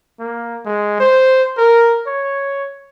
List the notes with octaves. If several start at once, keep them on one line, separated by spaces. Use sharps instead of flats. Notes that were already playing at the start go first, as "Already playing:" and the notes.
A#3
G#3
C5
A#4
C#5